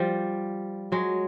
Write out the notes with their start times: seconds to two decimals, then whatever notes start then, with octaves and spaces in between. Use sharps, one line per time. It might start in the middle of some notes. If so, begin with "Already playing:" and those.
Already playing: F3 G3
0.92 F#3 G#3